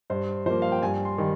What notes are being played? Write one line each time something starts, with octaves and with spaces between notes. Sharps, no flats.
G2 C5
F3 A#3 C5
F5
G5
G2 G#5
C6
D#3 G3